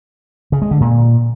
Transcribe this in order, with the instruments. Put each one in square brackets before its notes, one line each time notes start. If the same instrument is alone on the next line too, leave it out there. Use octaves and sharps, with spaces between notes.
[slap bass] C#3
G#3
D3
A#2